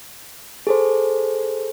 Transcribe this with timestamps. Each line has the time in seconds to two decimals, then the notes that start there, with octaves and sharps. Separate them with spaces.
0.67 G#4 A4 C5